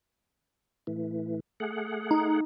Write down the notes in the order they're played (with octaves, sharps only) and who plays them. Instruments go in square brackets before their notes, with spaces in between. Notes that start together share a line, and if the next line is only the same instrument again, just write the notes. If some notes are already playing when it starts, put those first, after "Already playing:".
[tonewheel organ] A2 E3
A3 G#4 F#5
[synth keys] D#4